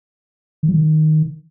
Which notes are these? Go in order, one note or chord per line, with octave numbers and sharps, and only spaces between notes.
D#3
F#3
D#3